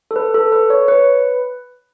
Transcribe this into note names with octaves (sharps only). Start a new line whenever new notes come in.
A4
B4
A4
B4
C#5
B4